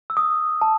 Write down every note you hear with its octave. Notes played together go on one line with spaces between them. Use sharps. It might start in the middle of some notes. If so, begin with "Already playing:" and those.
E6
D#6
A5